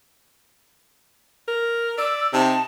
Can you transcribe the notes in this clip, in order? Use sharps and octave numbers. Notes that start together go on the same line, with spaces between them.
A#4
D5 E6
C3 D#4 A5